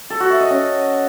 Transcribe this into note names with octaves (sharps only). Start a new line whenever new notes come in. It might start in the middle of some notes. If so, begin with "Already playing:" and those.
A4
F#4
E5
D#5
C#4